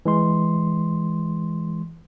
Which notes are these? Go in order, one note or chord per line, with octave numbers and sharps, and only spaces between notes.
E3 G#3 C6